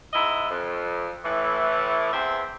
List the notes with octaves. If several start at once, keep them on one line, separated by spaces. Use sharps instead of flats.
G#2 E4 D#5 E5
F2
A2 E3
E2 C4 E5